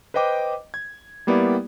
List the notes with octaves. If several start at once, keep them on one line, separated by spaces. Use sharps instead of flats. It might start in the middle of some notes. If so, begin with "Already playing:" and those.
B4 C5 D#5 G5 D6
G#6
G3 A#3 B3 E4 G4 D5